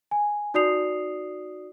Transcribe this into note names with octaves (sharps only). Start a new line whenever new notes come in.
G#5
D#4 F#4 D5 D#6 C7 F7